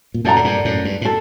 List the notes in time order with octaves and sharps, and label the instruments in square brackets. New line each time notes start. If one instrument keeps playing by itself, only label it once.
[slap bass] A#2
[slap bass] F#2 A2 [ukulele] A4 D5 F#5 A#5
[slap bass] A2
G2 A#2
F#2 A2
G2
A2
[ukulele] A4